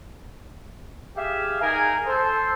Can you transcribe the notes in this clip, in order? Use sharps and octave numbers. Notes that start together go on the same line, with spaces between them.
G4 G#4 E5 F5
D#4 G#4 A#4 G#5
A4 C5